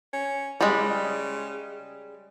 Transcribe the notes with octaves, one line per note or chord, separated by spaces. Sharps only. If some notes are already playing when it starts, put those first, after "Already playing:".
C#4
C#3 G3 G#3